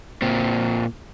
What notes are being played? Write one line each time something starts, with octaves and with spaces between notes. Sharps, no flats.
A#2 C4